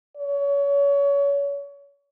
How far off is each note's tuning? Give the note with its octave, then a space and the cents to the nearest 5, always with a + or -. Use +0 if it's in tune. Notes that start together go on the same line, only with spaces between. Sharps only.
C#5 +30